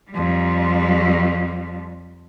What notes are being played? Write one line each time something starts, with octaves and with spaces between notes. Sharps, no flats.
F2 G3